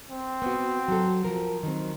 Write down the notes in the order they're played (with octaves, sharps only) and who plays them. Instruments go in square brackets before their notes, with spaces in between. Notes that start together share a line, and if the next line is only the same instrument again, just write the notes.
[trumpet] C4
[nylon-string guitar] B3 F#4
F#3 F#4 A4
F3 A#4
D#3 F#3 C4